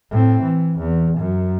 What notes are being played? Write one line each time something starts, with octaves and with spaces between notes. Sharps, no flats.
A2 C4
E3
E2
F#2